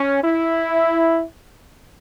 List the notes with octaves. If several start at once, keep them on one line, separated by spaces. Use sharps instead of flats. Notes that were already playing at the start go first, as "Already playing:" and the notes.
Already playing: C#4
E4